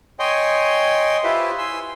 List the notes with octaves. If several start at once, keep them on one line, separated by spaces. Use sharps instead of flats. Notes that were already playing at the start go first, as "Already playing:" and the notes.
C#5 D#5 G5 G#5 C6
E4 F4 G4 B4 C5 E5
G#5 C6 E6